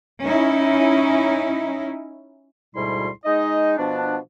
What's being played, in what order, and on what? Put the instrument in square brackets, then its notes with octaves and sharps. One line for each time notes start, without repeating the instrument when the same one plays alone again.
[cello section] C#4 D#4 E4
[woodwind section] D2 G#2 B2 G3 E4 C6
G#3 D#4 D#5
B2 F3 B3 D4